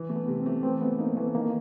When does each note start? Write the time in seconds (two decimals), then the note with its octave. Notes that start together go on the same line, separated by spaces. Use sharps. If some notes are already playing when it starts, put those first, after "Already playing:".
Already playing: E3
0.09 A3
0.16 B3
0.28 C3
0.39 C4
0.46 A3
0.63 E3 C4
0.81 A3 B3
0.99 A#3 D#4
1.17 E3 A3
1.35 D#3 A#3